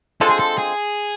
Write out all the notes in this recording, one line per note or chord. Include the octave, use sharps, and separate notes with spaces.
D3 F3 G#3 C4 A4
G#4
A4
G#4